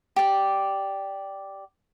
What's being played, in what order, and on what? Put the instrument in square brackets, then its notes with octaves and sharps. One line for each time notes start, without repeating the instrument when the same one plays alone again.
[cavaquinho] G4 D5